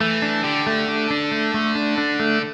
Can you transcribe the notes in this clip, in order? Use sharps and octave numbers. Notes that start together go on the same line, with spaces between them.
E3 A3
D4
D3 G4
A3
D4
D4
A3
A3
D4
D4
A3